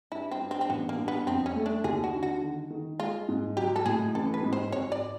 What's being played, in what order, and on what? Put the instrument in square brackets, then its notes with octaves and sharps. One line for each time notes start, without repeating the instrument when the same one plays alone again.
[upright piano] G2 [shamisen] E4
[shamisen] C4
[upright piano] G2
[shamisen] C4
C4
[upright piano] A1 [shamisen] B3
[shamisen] A#3
[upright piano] G2
[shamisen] B3
[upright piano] F2 [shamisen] C4
[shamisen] C#4
[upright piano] A3
[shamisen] D4
[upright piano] D#2 [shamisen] G#4
[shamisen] F#4
[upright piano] D3
[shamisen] F#4
[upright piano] D#3
D#3
[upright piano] G#3 [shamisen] F4
[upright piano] G#2
[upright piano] F#3 [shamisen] G4
[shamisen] A4
[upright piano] A2 [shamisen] G#4
[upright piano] A1 [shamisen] A4
[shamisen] B4
[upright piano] G#2
[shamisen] C5
[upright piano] G#1 [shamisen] C#5
[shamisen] D5